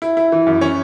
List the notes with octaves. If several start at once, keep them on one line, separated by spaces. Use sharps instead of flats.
E4
E4
E3
F#2
C#4